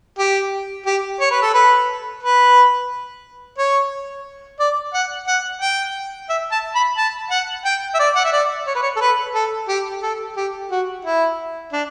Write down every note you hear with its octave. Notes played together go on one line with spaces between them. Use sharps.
G4
G4
C#5
B4
A4
B4
B4
C#5
D5
F#5
F#5
G5
E5
A5
B5
A5
F#5
G5
E5
D5
F#5
E5
D5
C#5
B4
C#5
A4
B4
A4
G4
A4
G4
F#4
E4
D4